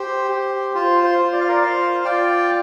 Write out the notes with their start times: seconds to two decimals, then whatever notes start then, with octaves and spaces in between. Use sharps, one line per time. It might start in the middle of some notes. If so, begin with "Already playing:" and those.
Already playing: G4 C5
0.31 G4
0.75 F4 C5
1.04 C5
1.18 F4
1.33 D5
1.41 F5
1.48 A#4 D5
1.61 F4 C5 F5
2.04 F4 D5 G5